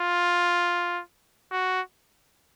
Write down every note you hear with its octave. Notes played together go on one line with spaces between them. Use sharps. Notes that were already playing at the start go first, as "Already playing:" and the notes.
Already playing: F4
F#4